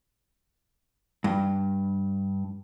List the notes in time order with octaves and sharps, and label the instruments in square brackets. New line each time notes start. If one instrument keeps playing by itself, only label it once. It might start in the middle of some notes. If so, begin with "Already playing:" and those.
[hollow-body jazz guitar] G2